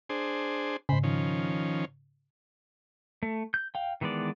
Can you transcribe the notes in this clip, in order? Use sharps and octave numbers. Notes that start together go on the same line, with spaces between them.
D4 G#4 C5
G#2 C#3 C5 B5
D#3 F3 C#4
A3
G6
F5 G5
D#3 E3 G#3 B3 D5